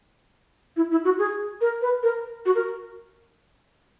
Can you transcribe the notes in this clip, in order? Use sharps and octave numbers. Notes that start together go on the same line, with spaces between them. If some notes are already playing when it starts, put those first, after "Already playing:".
E4
E4
F#4
G#4
A#4
B4
A#4
F#4
A#4